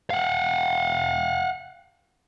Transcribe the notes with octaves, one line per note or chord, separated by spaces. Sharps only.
F5 F#5